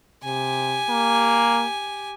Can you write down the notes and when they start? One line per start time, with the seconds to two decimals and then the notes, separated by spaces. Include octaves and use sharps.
0.24 C3 G4 G#5
0.89 A#3